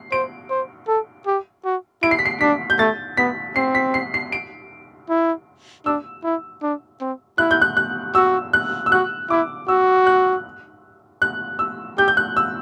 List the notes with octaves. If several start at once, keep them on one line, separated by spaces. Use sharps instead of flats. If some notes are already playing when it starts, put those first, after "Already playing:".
Already playing: C7
C5 D7
C5
A4
G4
F#4
E4 D7
C7
B6
C7
D4 B6
G6
A3 A6
B3 B6
C4 C7
B6
C7
C7
D7
E4
D4 E6
E4
D4
C4
E4 F#6
G6
F#6
F#6
F#4 E6
F#6
E6
F#4 F#6
E4 D6
F#4 E6
F#6
F#6
E6
G4 G6
G6
F#6
E6